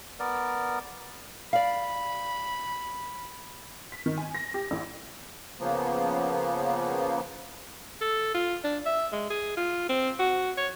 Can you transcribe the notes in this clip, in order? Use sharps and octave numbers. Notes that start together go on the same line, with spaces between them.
B3 A#4 D5
D5 F5 B5
B6
D#3
G#5
A#6
G4
A1
C#3 F3 A#3 B3
A4
F4
D4
E5
G#3
G#4
F4
C4
F#4
C#5